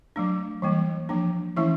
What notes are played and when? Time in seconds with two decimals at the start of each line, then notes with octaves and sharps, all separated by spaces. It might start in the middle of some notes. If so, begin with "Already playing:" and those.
0.16 F#3 A3 D4
0.62 E3 G3 A#3
1.09 F3 A#3 D4
1.57 E3 A3 C#4 E4 E5